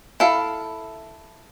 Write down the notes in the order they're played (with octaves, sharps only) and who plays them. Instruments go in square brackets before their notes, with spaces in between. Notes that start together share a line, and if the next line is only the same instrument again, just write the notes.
[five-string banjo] E4 A4 F5